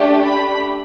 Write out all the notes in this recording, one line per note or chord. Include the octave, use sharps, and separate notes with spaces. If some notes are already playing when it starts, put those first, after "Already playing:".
Already playing: A3 D4 G4
B5